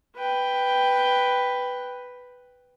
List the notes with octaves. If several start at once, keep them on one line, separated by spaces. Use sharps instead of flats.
B4 G5